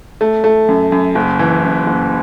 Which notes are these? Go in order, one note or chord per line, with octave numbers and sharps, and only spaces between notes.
A3
A3
F#2
F#2
F#1
E3
F#2
F#1